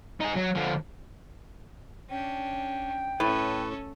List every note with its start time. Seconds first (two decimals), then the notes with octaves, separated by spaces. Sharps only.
0.21 D#4 G#4
0.36 F#3
0.56 D3 F3
2.10 C#4 D4 G5
3.20 A2 C#4 A4 B4